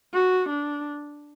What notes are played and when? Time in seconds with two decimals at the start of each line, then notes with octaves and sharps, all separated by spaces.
0.14 F#4
0.49 D4